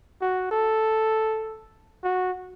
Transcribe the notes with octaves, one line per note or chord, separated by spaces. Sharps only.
F#4
A4
F#4